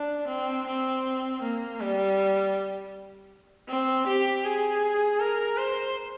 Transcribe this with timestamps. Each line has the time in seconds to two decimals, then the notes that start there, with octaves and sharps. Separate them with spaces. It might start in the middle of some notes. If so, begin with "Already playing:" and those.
Already playing: D4
0.28 C4
0.67 C4
1.42 A#3
1.80 G3
3.69 C4
4.07 G4
4.45 G#4
5.20 A#4
5.57 C5